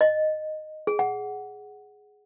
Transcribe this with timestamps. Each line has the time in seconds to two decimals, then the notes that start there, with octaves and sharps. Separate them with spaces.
0.01 D#5
0.87 G#4
0.99 F#5